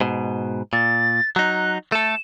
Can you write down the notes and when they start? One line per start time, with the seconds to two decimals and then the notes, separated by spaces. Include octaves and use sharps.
0.01 G#2 B2
0.73 A#2 A6
1.36 F#3 D#4 F#6
1.92 A3 A4 E7